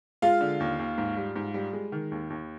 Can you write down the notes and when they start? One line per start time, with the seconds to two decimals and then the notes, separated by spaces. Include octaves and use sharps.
0.22 G#3 F4 F5
0.41 D3
0.60 D#2
0.79 D#2
0.98 G#2
1.17 G3
1.36 G#2
1.54 G3
1.73 G#3
1.92 D#3
2.12 D#2
2.30 D#2